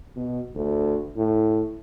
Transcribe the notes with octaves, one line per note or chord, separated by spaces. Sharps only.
B2
D2
A2